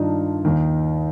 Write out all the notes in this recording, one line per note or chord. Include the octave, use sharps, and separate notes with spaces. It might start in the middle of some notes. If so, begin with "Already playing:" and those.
Already playing: G2 D#3 D4 D#4 F4
D#2 D#3